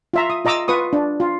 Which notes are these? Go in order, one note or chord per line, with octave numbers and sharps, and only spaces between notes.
F4 E5 A#5
D#6
F4 D#5 A#5 D6 E6
F4 B4 C#6 D#6
D4
F4